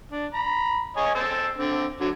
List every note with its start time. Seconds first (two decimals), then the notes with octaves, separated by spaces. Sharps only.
0.12 D4
0.34 A#5 B5
0.97 C#5 D#5 G#5
1.15 C5 A5 E6
1.58 D3 C4
2.00 D3 F#3